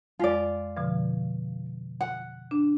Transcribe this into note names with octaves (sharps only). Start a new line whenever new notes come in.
F2 G#3 F4 D5
B2 D3 F3
F#5
D4